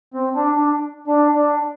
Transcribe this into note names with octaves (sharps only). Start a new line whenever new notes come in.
C4
D4
D4
D4
D4